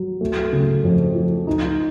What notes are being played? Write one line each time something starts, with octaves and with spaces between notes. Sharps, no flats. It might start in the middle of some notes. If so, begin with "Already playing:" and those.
Already playing: F#3
A3
C#3
F2
F3
D#4